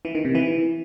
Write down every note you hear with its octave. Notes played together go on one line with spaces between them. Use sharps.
E3
D#3
C3
E3